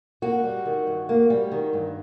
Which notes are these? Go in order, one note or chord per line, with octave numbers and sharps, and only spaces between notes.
A#3 F#4
G3
D#3
G2
A#3
G3
D#3
G2